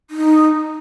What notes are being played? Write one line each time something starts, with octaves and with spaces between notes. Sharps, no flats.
D#4